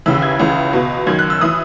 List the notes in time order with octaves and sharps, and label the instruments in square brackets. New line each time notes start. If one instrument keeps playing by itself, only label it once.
[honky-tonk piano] D#2 C#3 E3 E6
G#6
C#2 C#3 E3
C#2 B2
F#2 D#3 G#6
F#6
E6
E3 D#6